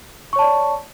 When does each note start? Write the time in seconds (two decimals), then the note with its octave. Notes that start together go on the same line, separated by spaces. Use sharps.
0.33 C#6
0.36 C#5
0.39 A5
0.42 D5